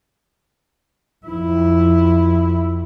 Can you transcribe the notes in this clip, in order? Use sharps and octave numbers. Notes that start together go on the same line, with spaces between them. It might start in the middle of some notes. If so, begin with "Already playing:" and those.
F2 E4